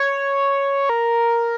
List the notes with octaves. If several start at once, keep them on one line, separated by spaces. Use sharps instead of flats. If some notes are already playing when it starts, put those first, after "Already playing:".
Already playing: C#5
A#4